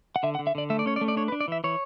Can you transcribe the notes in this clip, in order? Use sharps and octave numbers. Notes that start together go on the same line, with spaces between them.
F#5
D3 E5
F#5
D3
E5
D3 D5
A3 E5
D5
C#4 C#5
D5
A3
D5
D4 C#5
B4
D4
D5
E3 E5
E3 C#5